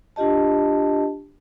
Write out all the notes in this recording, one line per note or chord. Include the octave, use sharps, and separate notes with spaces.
D4 F4 G4 D#5 A5